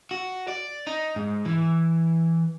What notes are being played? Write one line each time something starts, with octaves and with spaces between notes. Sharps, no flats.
F#4
D5
D#4
G#2
E3